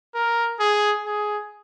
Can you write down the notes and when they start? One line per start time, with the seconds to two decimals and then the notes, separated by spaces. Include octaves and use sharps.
0.15 A#4
0.59 G#4
1.05 G#4